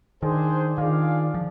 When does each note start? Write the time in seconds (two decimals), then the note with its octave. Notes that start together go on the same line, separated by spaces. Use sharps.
0.22 D#3 D4 G#4 C5
0.78 D#3 D4 F4 G#4 D5 F5
1.34 F3